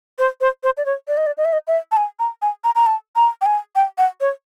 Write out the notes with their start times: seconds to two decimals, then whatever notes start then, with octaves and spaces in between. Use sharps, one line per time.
0.19 C5
0.41 C5
0.63 C5
0.77 D5
0.86 C#5
1.08 D5
1.17 D#5
1.27 D5
1.37 D#5
1.45 E5
1.53 D#5
1.67 E5
1.92 A5
1.97 G#5
2.19 A#5
2.42 G#5
2.64 A#5
2.76 A#5
2.86 A5
3.16 A#5
3.41 G5
3.46 G#5
3.76 G5
3.98 F#5
4.21 C#5